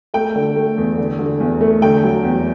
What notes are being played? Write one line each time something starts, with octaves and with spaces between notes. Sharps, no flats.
A3 G5
D3
A3
E2
D3
D3
E2
A3
D3 G5
F#3
E2